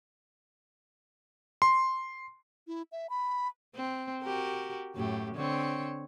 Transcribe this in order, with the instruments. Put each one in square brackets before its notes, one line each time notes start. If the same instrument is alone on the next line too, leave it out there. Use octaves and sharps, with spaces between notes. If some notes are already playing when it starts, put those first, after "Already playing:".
[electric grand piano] C6
[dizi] E4
E5
B5
[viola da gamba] C4
F#4 G4 A#4
F#2 A2 G4
D3 C4 C#5